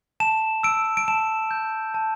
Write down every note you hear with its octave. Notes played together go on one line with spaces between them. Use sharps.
A5 E7
E6 D7
D7
A5 E7
G6
A5